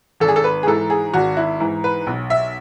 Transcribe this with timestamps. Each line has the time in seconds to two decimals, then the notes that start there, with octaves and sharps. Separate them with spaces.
0.20 G#1 A4
0.28 G#4
0.36 A4
0.44 B4
0.63 G#4
0.67 G#2 E3 A4
0.90 G#4
1.14 G#1 F#4
1.37 E4
1.60 G#2 E3
1.84 B4
2.07 B1
2.30 E5